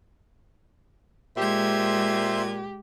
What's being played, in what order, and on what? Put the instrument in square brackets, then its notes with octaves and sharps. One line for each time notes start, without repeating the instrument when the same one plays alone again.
[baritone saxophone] A#2 [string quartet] G#3 G#6 [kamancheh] G4 [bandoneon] C5 E5 C6